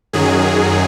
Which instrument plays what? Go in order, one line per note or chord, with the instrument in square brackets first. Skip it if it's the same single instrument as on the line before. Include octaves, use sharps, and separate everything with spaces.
[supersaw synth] F#2 D#3 F#3 G#4